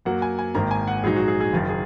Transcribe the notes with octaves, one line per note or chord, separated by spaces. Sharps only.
F#2 F#3 A#3 F#5
G#5
G#5
G#1 G#2 D#3 A#3 A#5
G#5
F#5
A#1 G#2 F#3 D#4 G#4
F#4
G#4
G#4
F#1 F#2 D#3
G#4